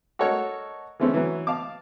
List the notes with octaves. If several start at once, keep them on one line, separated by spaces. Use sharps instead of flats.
F#4 A4 A#4 C#5 D#5 F#5
E3 G#3 A3 C4 C#4
E3 F#3
F5 A5 D6